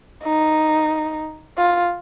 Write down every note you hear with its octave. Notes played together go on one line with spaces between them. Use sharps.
D#4
F4